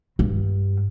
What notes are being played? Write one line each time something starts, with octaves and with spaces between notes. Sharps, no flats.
G2